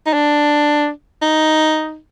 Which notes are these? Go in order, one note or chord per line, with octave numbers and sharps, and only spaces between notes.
D#4
D4
D#4